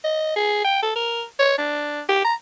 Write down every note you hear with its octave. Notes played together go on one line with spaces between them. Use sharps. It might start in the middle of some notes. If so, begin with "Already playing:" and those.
D#5
G#4
G5
A4
A#4
C#5
D4
G4
A#5